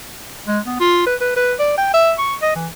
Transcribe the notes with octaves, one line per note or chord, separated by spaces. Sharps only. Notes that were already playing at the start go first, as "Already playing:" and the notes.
G#3
B3
F4
B4
B4
B4
D5
G5
E5
C#6
D#5
E3